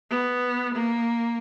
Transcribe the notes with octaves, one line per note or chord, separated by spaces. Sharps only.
B3
A#3